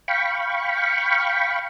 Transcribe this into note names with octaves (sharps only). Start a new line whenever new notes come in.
F5 G5 B5 C#6